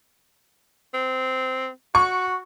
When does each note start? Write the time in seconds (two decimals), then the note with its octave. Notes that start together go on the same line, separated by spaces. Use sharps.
0.94 C4
1.95 F#4 C#6